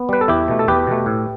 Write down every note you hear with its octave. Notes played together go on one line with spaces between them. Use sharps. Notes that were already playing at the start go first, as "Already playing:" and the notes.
Already playing: B3
G3 B4
A4
E2 E4 G4
B2 A3
A4
E2 G4 B4
B2 A3
A2